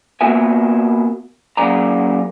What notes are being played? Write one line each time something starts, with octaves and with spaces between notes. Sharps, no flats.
A#3 B3 F#4 A#4 E5 G#5
F#2 A#3 G#4 D5 A#5